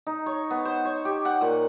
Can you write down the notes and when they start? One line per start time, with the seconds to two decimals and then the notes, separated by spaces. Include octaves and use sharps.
0.07 D#4
0.26 C#5
0.51 B3
0.65 C5
0.85 C#5
1.05 G4
1.25 F#5
1.41 A#2